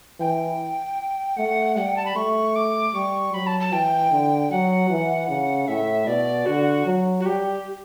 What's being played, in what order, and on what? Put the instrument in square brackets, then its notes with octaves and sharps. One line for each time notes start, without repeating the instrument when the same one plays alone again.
[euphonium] E3 [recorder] G5
[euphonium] A3 [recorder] F#5
[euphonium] G3 [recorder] F#5
[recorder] G5
A5
B5
[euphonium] A3 [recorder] C#6
[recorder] D6
[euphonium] G3 [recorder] C#6
[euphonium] F#3 [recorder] B5
[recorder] A5
A5
[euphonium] E3 [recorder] G5
[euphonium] D3
[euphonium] F#3 [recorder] F#5
[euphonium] E3
C#3
[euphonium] A2 [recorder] E5
[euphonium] B2 [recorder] D5
[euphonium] D3 [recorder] F#4
[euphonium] F#3
[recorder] F#4
[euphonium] G3 [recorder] G4